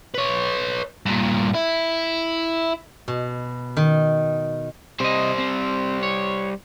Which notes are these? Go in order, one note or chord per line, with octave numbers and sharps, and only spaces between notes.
B4 C#5
G2 A#2
E4
B2
D#3
C3 G3 C5 D#5
C4
C#5